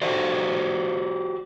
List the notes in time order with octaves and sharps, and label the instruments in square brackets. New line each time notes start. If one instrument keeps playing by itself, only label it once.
[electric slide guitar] F#4 G4 C5 D5